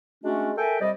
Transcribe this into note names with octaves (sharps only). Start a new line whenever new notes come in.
G#3 A3 C#4 D4 F#4
A4 A#4 E5 G5 G#5
C3 G3 D5 D#5